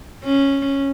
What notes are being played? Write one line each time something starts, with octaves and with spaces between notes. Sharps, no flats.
C#4